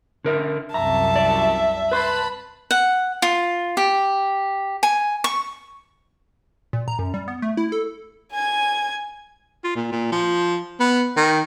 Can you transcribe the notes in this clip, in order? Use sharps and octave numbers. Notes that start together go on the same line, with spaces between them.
D3 A#4 E5
C2 F#2 E5 A5 A#5
D5
B4 A5 B5 C6
F#5
F4
G4
G#5
C#6
A#2
A#5
F#2
G3
B3
A3
E4
A4
G#5 G#6
F4
A#2
A#2
F3
B3
D#3